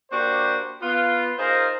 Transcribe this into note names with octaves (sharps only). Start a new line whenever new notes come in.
A#3 D4 F#4 G4 C5
B3 F4
D#4 F4 G#4 A#4 C5